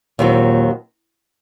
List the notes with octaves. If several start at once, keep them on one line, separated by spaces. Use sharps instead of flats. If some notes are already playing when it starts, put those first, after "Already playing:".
D#2 A#2 D#3 F#3 C4